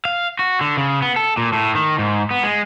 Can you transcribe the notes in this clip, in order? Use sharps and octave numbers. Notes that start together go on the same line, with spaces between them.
F5
F#4
D3
C#3
B3
A4
A#2
A2
D#3
G#2
B3
G#3